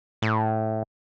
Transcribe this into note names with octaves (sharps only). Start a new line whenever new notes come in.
A2